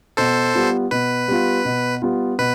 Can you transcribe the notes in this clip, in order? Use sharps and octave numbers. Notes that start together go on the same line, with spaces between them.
B2 A4 C5
G3 B3 F4
B2 B4
G3 B3 F4
B2
G3 B3 F4
B2 B4